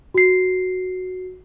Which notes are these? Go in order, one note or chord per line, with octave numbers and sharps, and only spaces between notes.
F#4 C7